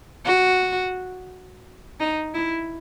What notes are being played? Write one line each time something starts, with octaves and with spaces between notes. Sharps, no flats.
F#4
D#4
E4